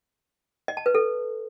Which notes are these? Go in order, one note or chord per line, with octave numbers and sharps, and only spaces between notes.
D#5
A5
B4
A4